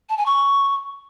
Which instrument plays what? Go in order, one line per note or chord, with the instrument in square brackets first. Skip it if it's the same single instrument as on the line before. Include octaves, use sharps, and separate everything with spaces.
[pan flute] A5
G#5
C#6